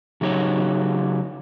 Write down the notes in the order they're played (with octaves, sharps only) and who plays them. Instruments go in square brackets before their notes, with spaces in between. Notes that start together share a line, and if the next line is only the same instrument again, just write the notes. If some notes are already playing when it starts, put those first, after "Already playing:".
[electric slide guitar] C#3 F#3 D#4 G4 C#5